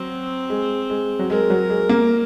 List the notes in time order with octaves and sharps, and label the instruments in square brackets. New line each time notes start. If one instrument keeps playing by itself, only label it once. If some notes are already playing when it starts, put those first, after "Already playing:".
Already playing: [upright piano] F#3 [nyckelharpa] C4
[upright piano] G#3
G#3
F#3
[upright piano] G#3 [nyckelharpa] A#4
[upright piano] F#3
G#3
A#3